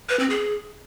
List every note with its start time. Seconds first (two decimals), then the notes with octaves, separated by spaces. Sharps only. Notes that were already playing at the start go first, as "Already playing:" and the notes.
0.09 B4
0.19 C4
0.30 G#4